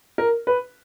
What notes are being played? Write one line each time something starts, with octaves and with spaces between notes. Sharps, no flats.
A#4
B4